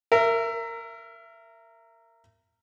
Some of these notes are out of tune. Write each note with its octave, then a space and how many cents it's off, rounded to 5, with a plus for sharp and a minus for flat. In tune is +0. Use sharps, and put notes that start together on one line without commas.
A#4 -15 E5 +25